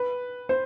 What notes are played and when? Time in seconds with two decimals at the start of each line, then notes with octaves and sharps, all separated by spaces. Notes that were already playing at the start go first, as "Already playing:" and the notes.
Already playing: B4
0.49 C5